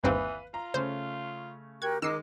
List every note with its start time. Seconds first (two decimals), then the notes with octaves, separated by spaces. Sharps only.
0.04 G1 D#2 E3 C4 B4 F5 B5
0.54 F4 A#5
0.74 C#3 A3 C#4 C5
1.82 F#4 G4 A#4 G5 G#6
2.02 D#3 G#3 D#4 A#4 D6 E6 C7